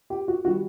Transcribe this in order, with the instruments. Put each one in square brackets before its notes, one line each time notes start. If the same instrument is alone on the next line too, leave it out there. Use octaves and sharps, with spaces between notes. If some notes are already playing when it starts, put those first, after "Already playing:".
[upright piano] G4
F#4
D#3 G3 F#4